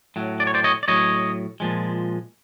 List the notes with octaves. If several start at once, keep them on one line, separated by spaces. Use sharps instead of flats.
A2 F#3
D5
C#5
C5 D5
C#5 D#5
D5
A2 F#3 C#5 D#5
A#2 F3 G#3